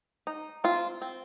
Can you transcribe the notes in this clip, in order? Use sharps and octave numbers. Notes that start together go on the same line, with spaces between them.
D#4
C4 F4
C4